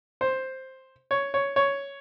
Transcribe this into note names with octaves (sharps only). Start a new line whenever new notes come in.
C5
C#5
C#5
C#5